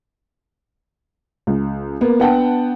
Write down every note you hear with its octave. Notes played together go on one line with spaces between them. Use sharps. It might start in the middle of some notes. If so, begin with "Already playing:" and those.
C#2
A#3 B3
B3 D4 F#5 G5 A5